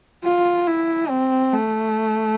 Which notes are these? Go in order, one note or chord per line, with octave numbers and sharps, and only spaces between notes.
F4
E4
C4
A3